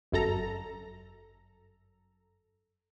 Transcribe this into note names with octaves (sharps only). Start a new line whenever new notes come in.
G1 F#2 A4 A#5